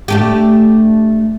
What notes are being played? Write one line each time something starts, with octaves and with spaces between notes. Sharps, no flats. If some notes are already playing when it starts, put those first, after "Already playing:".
A3 D4 G4